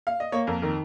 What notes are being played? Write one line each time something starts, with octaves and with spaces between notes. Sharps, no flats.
F5
D#5
A#3 C#5
F2 A#4
D#3 A#4